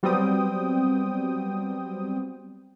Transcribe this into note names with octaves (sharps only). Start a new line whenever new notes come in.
F#3 G3 B3 C4 G5 D#6